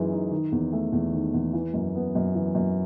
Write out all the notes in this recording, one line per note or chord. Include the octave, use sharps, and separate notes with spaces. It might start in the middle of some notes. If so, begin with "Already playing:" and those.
Already playing: F#2 E3 G#3 D#4
D#4
D#3
E2
A3
E2
D#3
E2
E3
F#2
B3
F#2
E3
F#2